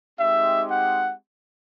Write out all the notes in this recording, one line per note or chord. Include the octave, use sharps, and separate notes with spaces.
G#3 C4 D#4 G4 E5
F#5